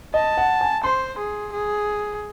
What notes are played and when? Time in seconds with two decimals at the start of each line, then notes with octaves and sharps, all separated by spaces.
0.14 D#5 A5
0.37 F#5
0.61 G#5
0.84 C5 C6
1.18 G#4
1.53 G#4